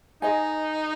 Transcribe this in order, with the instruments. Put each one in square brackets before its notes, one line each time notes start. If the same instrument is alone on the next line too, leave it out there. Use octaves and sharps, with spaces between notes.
[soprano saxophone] D#4 [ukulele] G#4 D#5 G#5